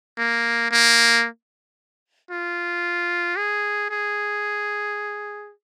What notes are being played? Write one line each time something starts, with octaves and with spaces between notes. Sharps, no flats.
A#3
A#3
F4
G#4
G#4